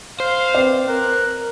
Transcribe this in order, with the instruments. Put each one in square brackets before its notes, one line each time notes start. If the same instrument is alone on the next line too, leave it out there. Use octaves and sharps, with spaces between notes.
[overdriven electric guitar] C5 [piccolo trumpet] F5
[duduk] C4 [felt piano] B4 D5
[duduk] A#4 [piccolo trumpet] F#6